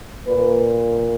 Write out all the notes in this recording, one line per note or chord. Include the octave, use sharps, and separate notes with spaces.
A#2 A#3 B4